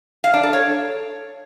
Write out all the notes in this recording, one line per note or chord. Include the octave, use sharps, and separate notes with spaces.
F5
D4
A4
C#5